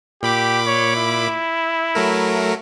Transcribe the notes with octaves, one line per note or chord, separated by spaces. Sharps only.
A#2 G4 B5 D6
C#5
E4
F#3 A3 A#4